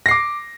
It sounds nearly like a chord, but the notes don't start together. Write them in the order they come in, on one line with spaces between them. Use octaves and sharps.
A#6 C7 D6